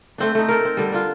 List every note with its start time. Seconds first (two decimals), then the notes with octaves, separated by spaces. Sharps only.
0.18 A3 C4 D4
0.35 A3 D#4
0.49 A4 A#4
0.65 C4
0.77 D3 G3
0.92 D4 F4